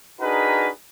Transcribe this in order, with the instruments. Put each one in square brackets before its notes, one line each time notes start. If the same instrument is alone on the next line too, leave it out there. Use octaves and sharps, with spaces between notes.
[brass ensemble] D4 D#4 F#4 G#4 A#4 B4